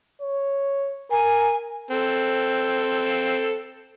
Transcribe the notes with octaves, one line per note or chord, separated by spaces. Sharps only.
C#5
A#4 G#5
C4 A4